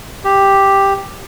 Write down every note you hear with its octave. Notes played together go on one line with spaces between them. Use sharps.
G4